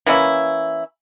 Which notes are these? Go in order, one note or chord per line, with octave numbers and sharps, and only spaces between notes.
E3 A#3 C#4 E4